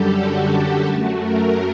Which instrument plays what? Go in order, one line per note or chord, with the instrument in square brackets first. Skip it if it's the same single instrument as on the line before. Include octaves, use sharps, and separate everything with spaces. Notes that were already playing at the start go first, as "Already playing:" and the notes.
Already playing: [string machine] F#2 D3 G3 G4 A4
F#4
F#2 F#3 A3
A#4